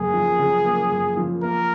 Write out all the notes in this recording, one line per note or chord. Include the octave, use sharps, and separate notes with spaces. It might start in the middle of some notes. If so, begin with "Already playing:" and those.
Already playing: F#2 C#3 A#3 G#4
F3
C#3
A#3
F#2
F3
A#3 A#4